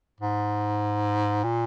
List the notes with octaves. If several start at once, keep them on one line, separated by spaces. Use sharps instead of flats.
G#2
A#2